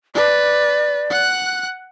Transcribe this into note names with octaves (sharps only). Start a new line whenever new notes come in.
B4 D5
F#5 F#6